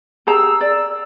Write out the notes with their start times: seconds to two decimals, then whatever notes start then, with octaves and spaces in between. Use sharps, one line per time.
0.27 G4 G#4 A#5 E6
0.61 D5